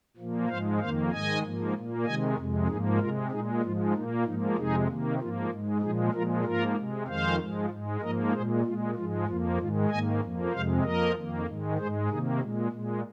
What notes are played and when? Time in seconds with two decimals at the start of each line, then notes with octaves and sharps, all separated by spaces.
0.17 A#2 F3 A#3
0.48 G#2 F3 G#3 C5 F5
0.80 F2 D#3 A#3 C5 F5
1.11 G#2 D#3 G#3 D#5 G#5
1.43 G#2 F3 A#3
1.74 A#2 A#3
2.05 C3 D#3 G#3 D#5 G#5
2.36 F2 C3 G#3
2.68 G#2 F3 A#3 D#4 G#4
2.99 C3 G#3 F4 A#4
3.30 A#2 G#3 D#4 G#4
3.62 G#2 F3 G#3 F4
3.94 A#2 A#3 D#4
4.25 G#2 F3 A#3 D#4
4.56 F2 C3 G#3 D#4 G#4
4.88 C3 D#3 A#3
5.19 G#2 F3 A#3 F4
5.50 G#2 G#3
5.81 A#2 F3 G#3 D#4 G#4
6.13 A#2 F3 G#3 F4 A#4
6.44 G#2 F3 A#3 F4 A#4
6.76 C3 G#3
7.07 F2 D#3 G#3 C5 F5
7.38 G#2 F3 G#3
7.70 G#2 G#3
8.01 G#2 F3 A#3 A#4 D#5
8.32 A#2 G#3 G#4 C5
8.64 A#2 G#3 F4
8.95 G#2 F3 G#3 F4
9.26 F2 F3 A#3 F4
9.58 G#2 D#3 G#3 F4
9.89 G#2 D#3 A#3 D#5 G#5
10.21 F2 F3 A#3
10.52 F2 C3 G#3 C5 F5
10.83 F2 F3 A#3 A#4 D#5
11.15 F2 D#3 A#3
11.46 G#2 D#3 G#3
11.78 G#2 G#3 G#4 C5
12.09 C3 D#3 A#3 D#4 G#4
12.41 A#2 G#3
12.72 A#2 G#3